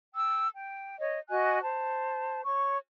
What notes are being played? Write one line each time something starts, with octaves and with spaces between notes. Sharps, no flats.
G5 E6
G5
C#5 D#5
F#4 D#5 G#5 F#6
C5 A5
C#5 C#6